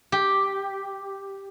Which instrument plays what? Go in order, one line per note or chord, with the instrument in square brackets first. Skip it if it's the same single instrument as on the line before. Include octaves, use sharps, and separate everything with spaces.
[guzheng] G4